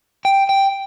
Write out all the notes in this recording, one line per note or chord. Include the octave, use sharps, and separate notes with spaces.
G5
G5